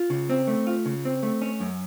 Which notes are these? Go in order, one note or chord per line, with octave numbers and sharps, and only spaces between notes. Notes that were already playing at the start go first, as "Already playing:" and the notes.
Already playing: F4
C#3
C4
A3
F4
C#3
C4
A3
C#4
F#2